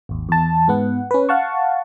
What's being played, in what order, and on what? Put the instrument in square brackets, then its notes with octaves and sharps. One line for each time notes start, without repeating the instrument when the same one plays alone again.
[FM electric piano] G#1 D#2
E2 A5
G#2 B3 F#5
C#4 B4
F5 F#5 A5 C#6